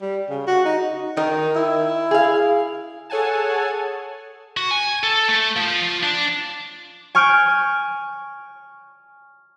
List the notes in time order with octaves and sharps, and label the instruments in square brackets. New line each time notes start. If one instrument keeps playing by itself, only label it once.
[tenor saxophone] G3
C#3
F#4
D#4
[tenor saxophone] D#3 [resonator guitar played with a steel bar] A#4
[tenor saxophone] E4
[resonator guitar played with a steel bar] G#4 F5
[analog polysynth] G#4 A4 C#5 F#5 G#5 A5
[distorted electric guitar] F#4
G#5
A4
A3
F3
D4
[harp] G#5 C#6 F6 G6 G#6 D7